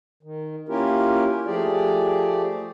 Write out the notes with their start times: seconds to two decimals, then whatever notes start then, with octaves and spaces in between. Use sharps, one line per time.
0.23 D#3
0.69 A#3 C#4 E4 F4 G4 A#4
1.47 F3 A3 G4 G#4 D5